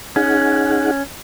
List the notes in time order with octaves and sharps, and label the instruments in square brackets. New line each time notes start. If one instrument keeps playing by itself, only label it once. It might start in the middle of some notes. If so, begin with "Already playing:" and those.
[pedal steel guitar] C#4 [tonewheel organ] D#4 G#4 F#5